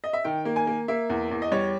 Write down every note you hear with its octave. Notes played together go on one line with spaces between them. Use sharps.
D#5
E5
D#3 G5
A#3
G#5
A#3
A#3 E5
E2
E2
D#5
G3 C#5